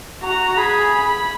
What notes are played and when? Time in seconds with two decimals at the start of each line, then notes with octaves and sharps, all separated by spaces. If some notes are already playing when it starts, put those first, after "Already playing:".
0.23 F#4 A#5
0.57 G#4 B5
0.92 B5